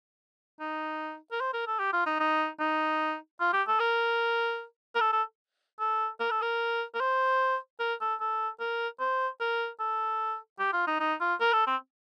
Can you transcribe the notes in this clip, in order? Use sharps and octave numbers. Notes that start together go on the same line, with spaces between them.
D#4
A#4
C5
A#4
A4
G4
F4
D#4
D#4
D#4
F4
G4
A4
A#4
A#4
A4
A4
A4
A#4
A4
A#4
A#4
C5
A#4
A4
A4
A#4
C5
A#4
A4
G4
F4
D#4
D#4
F4
A#4
A4
C4